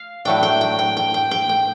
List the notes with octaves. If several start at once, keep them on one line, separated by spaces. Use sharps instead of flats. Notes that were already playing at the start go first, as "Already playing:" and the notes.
Already playing: F5
A2 F#3 A3 D4 G5
G5
G5
G5
G5
G5
G5
G5